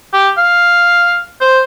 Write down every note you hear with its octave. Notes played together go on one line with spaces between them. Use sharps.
G4
F5
C5